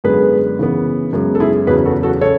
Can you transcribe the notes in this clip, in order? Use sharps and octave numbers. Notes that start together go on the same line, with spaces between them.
F#2 D3 G#3 B3 G#4 B4
C#3 E3 B3
F#2 C#3 G#3 B3
A4
E4 G#4
E2 C#3 F#3 G#4 B4
F#4 A4
F#4 A4
C#3 A4 C#5